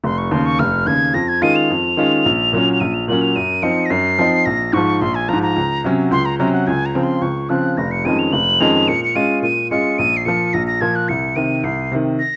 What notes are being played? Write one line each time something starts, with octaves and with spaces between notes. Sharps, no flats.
F1 C6
C#6
D#2 C#3 C6
C#6
F1 F6
D#2 C#3 G#6
F2 A#6
G#6
D#3 G#3 C#4 F4 D#7
F7
F2
D#3 G#3 C#4 F4
A#1
A#2 F#3 A#3 C#4
F7
A#1 D#7
F7
A#2 F#3 A#3 C#4 F#7
F7
F#2 D#7
F3 C4 D#4 C#7
A#6
F#2 C7
F3 C4 D#4
A#1 A#6
G#2 F3 C#6
A#1 C6
G#5
G#2 F3 A#5
A#5
C#2
C3 F#3 C#4
C#2 C6
A#5
C3 F#3 C#4 A#5
F#5
C#2 G#5
A#5
C#3 F3 C4
C6
C#2 C#6
C#3 F3 C4 F#6
F1 A#6
C#7
F2 D#3 G#3 C#4 D#7
F7
F1 F#7
F2 D#3 G#3 C#4 F7
A#2 C#7
C#7
G#3 C#4 F4 D#7
A#2 D#7
G#3 C#4 F4 C#7
A#1 D#7
C7
A#2 F3 C#7
A#1 A#6
A#6
A#2 F3 G#6
F#6
C2 C#7
C3 D#3 D#7
C2 C7
C3 D#3
A#6